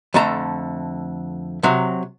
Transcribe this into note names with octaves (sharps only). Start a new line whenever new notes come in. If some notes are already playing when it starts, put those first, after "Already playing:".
F2 D3 A3 A5 A#5
C3 F#3